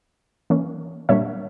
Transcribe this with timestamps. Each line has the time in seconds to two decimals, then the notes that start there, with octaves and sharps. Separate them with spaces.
0.50 E3 A#3 C#4
1.09 A#2 G3 A#3 D4 C#5 E5